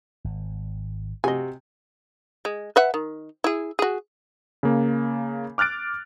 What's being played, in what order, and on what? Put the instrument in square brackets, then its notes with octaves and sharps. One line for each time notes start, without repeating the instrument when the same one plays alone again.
[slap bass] G#1
[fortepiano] C3 F#4 [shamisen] D#5 G#5
[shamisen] G#3
B4 E5 F#5
D#3
E4 G#4
F#4 G#4
[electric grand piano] C#3 A#3
D6 F6 F#6 A6 D7